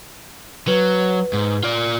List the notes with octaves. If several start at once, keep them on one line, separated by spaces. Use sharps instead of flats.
F#3 B4
G#2
F4 D5